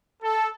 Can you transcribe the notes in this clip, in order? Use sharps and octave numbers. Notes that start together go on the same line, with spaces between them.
A4